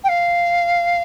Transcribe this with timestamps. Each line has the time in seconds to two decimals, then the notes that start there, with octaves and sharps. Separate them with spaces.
0.04 G5
0.08 F5